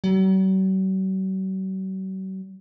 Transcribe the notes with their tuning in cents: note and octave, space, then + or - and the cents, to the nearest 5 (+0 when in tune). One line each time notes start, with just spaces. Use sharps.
F#3 +45